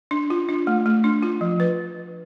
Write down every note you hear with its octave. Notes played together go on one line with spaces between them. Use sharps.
D4
F4
D4
A3
A3
D4
F4
F3
B4